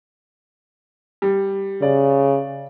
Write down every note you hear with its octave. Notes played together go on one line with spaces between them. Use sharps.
G3
C#3 D5